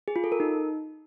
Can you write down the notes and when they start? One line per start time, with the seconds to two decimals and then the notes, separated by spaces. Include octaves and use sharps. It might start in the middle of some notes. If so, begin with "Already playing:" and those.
0.08 G#4
0.16 F4
0.24 A4
0.32 A#4
0.40 D#4